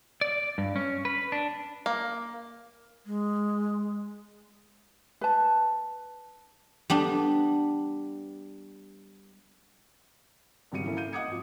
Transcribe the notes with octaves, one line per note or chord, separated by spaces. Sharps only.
D5
G2
C#4
B4
D4
A#3
G#3
B4 A5
G3 B3 D4
G#1 C#3 G3 C#7 D#7
E3 A#3 C#4 E4 A4
F5 G6 D#7
D#5 F#5 D6 D#6 G#6 C#7
G#1 F3